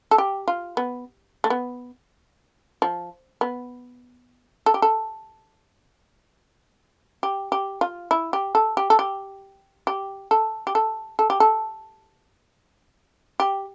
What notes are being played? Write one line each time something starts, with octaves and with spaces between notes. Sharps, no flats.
A4
G4
F4
B3
A3
B3
F3
B3
A4
G4
A4
G4
G4
F4
E4
G4
A4
G4
A4
G4
G4
A4
G4
A4
A4
G4
A4
G4